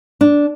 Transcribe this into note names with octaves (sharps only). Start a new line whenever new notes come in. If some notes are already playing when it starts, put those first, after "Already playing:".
D4